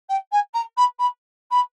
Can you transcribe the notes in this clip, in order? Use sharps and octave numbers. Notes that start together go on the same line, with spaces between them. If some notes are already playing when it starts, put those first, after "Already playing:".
G5
G#5
A#5
B5
B5
B5